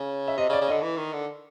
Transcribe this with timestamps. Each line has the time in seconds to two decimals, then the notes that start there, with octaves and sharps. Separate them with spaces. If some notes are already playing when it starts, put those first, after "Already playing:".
Already playing: C#3
0.28 E5
0.37 C3 D#5
0.49 C#3
0.53 D5
0.61 C#3
0.68 D#5
0.71 D3
0.82 E3
0.97 D#3
1.13 D3